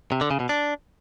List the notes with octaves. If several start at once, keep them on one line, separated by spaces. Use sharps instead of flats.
C3
D3
C#3
B2
D4